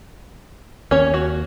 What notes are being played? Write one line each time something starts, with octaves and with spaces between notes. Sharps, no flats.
D#2 C#4 C#5
F#4